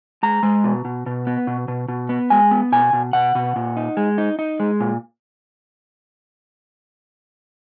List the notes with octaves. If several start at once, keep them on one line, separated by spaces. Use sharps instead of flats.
G#3 A#5
G#3
B2
B2
B2
B3
B2
B2
B2
B3
G#3 G#5
B3
B2 G#5
B2
B2 F#5
B2
A#2
D#4
G#3
D#4
D#4
G#3
A#2